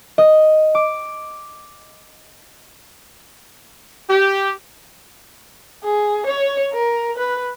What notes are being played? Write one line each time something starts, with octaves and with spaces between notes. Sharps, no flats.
D#5
D6
G4
G#4
C#5
A#4
B4